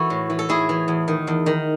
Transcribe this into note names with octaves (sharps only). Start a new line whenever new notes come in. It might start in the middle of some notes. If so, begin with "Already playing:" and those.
Already playing: E3 E4 F#4 A4
A2
E3
A4
A2 E4 G#4
E3
E2
D#3
E2
D#3